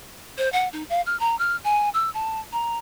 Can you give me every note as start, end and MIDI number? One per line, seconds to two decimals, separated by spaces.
0.38 0.51 72
0.53 0.68 78
0.73 0.84 63
0.89 1.01 77
1.06 1.18 89
1.20 1.38 82
1.39 1.56 89
1.64 1.89 80
1.94 2.10 88
2.14 2.40 81
2.52 2.78 82